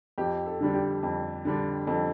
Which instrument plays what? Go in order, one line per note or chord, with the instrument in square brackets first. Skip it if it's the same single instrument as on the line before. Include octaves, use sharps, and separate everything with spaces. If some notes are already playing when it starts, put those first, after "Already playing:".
[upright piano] F2 G4
A4
D3 G3 D4
G4
F2
D3 G3 D4
F2 A4